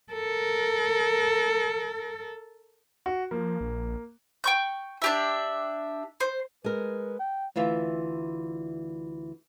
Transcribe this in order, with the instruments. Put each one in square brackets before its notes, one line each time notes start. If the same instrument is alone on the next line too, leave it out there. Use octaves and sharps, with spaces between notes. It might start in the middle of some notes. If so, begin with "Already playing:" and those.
[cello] A4 A#4
[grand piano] F#4
[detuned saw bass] F3 [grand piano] A#3
[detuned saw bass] A#1
[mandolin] G5 C#6 G6
D4 G4 E5
C5
[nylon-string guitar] G#3 A#4 [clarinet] B4
[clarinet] G5
[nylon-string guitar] D2 E3 F4 E5